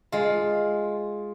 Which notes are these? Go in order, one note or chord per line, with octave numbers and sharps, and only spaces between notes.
G#3 F4